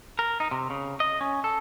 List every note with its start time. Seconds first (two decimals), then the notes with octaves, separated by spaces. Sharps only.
0.19 A#4
0.40 D#4
0.51 C3
0.70 C#3
1.00 D#5
1.21 C#4
1.44 A4